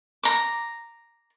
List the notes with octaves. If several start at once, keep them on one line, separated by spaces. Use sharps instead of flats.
A#5 D6